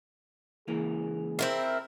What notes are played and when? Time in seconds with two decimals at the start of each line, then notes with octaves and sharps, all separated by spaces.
0.68 C#2 E3 A#3 G#4
1.39 C4 E4 A#4